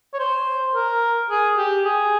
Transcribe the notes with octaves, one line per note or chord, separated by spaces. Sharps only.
C#5
C5
A#4
G#4
G4
G#4